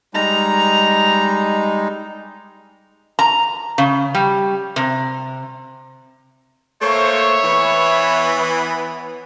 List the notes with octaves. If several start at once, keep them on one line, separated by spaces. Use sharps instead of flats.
G3 G#3 D#4 A#5
A#5
C#3
G3
C3
A3 A#3 C5 C#5 E5 C#6
E3 B3